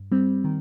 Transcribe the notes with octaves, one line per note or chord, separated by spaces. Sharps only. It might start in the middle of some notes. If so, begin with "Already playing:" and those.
Already playing: G2
G3 C4
D#3